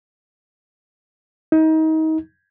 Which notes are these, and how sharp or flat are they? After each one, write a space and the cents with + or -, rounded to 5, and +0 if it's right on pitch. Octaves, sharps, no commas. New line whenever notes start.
D#4 +30